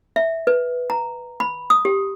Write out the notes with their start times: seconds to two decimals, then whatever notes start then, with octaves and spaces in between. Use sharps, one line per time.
0.16 E5
0.47 B4
0.90 A#5
1.40 B5
1.70 D#6
1.85 G4